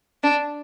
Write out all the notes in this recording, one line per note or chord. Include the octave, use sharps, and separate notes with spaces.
D4